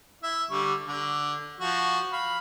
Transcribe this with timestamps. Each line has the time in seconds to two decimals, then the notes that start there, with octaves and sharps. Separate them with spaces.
0.23 E4 E5
0.50 D3 G3 C#6
0.87 D3
1.60 F3 F#4
2.13 F5 B5